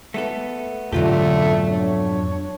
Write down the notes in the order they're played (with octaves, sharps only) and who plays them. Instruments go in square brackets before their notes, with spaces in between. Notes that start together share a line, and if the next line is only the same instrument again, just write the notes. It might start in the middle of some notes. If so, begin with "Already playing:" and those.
[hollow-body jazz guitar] A3 B3 A4
[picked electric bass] F2 G#2 B2 [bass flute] D3 [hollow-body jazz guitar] F#3 F4 G4 [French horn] A3
[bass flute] D4 [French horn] C#5